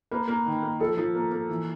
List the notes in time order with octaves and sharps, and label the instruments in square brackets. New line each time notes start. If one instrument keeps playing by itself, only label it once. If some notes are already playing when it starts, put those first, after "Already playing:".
[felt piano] A#3 [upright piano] B4
[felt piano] A#3
D#3
A#3
[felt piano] F3 [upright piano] A4
[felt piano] F3
A#3
A#3
E3